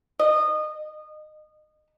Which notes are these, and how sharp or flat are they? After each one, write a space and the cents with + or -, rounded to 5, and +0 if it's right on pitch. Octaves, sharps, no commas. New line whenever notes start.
D#5 -25